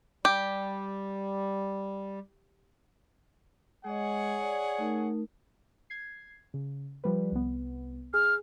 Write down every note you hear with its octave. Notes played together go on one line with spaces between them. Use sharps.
G3 G4
G#3 G#4 C#5 D#5 F#5
D5
A3 D#4 A#4
G#6 C7
C#3
F3 G3 B4
C2 B3
G#4 F6